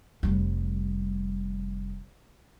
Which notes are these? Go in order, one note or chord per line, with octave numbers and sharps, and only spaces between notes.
F1 G3